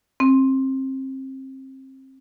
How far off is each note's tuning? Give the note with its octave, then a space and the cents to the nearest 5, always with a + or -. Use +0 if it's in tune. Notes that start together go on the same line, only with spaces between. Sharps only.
C4 +30